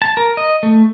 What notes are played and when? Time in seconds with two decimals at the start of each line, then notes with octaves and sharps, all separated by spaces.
0.02 A5
0.17 A#4
0.37 D#5
0.63 A3